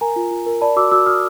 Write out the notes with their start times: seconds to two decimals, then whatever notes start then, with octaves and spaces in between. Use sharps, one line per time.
0.01 A#4 G#5 A#5
0.16 F4
0.31 F4
0.46 A#4
0.61 D5 A5 B5
0.76 F#4 D6 E6
0.91 F#4 D6 E6
1.06 F#4 D#6 F6